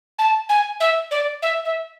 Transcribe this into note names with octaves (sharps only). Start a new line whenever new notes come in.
A5
G#5
E5
D5
E5
E5